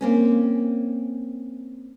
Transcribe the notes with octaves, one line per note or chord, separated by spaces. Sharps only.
A#3 C4 C#4